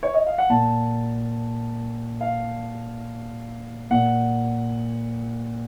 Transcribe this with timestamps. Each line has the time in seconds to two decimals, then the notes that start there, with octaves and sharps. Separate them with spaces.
0.03 C#5
0.14 D#5
0.27 F5
0.38 F#5
0.50 A#2 A5
2.21 F5
3.90 A#2 F#5